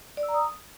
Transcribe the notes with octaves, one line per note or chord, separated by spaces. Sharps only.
D5
E6
A#5
D#6